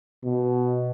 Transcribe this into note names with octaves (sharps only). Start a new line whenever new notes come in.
B2